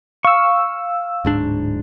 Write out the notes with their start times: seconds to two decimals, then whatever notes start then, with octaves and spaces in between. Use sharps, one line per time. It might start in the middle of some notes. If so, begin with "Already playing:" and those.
0.25 F5 C#6 E6
1.25 D1 G#2 D4